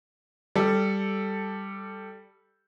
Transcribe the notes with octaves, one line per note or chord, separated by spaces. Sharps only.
G3 A4